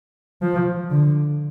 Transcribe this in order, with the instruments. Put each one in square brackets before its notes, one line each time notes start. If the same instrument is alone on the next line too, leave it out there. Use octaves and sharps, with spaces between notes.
[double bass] F3
D3